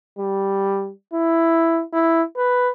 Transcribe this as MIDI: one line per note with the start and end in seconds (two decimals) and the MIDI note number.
0.19 0.90 55
1.13 1.81 64
1.93 2.22 64
2.37 2.70 71